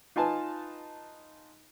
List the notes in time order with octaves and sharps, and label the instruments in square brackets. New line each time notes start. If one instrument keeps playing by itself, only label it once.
[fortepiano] D#4 F4 B4 G#5 A5